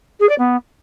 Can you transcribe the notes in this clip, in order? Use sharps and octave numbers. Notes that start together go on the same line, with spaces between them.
G#4
D5
B3